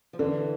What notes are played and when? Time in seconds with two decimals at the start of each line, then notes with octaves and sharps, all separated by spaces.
0.13 F3
0.19 D3 E3